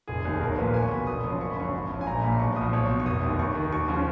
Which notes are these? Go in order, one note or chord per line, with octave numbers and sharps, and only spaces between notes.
F1 G#4
D#2 D#3
B1 A#4
A#2 F3 B4
B1 G#5
C#6
B2 B5
F#1 D#6
F#2 F3
F#1 C#6
B5
F#2 F3 C#6
G#1
F#2 F3
G#5
A#1 A#5
A#2 F3 B5
B1 C#6
A#2 F3 D#6
B1 C#6
B2
C#6
F1 D#6
D#2 D#3
D#2 C#6
D#3
D#2 C#6
C#3 F3